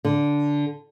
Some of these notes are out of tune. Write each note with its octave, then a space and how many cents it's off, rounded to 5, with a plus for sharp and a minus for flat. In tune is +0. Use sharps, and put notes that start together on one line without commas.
D3 -10